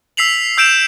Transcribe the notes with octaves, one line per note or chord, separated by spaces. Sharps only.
E6 B6 C7 F7 F#7
E6 G6 D7 E7 F7